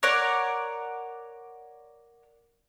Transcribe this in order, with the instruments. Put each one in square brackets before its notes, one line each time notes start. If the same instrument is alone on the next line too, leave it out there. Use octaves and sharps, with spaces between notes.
[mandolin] A#4 C#5 D5 F#5